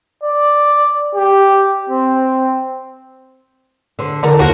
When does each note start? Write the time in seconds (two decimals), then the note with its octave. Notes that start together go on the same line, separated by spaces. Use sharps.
0.23 D5
1.15 G4
1.90 C4
3.99 D3 C5
4.23 E2 D3 A4 A#4
4.39 D#2 F4 F#4 A#4 C5 F5